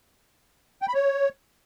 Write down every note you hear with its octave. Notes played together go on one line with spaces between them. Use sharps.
G5
B5
C#5